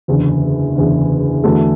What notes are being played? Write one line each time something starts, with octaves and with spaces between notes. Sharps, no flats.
F#1 E2 D3
F#1 E2 D3
E2 D3 A3 F#4 A4